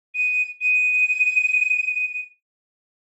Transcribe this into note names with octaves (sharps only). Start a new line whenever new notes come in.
D#7
D#7